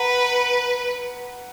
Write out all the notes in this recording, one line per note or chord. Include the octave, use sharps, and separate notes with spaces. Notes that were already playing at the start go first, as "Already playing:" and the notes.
Already playing: B4 F#5 A#5